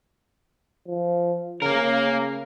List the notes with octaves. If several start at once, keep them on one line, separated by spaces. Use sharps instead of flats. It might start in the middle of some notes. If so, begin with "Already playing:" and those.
F3
C#3 A#3 A#4